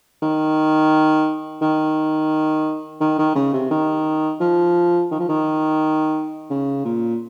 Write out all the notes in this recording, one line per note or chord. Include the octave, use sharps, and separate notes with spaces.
D#3
D#3
D#3
D#3
C#3
C3
D#3
F3
D#3
F3
D#3
C#3
A#2